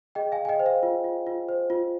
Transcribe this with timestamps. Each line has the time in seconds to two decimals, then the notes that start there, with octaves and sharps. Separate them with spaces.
0.15 G#4 D#5 G5
0.32 F5 G#5
0.38 G#4
0.45 G#5
0.48 D#5 G5
0.59 C5
0.66 F5
0.83 F4
1.04 F4
1.27 F4
1.49 C5
1.70 F4